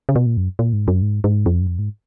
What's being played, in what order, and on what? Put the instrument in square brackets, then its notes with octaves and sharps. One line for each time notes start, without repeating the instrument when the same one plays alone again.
[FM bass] C#3
B2
A#2
F#2
A#2
G#2
F#2
G#2
G#2
F2
F#2
F2
G#2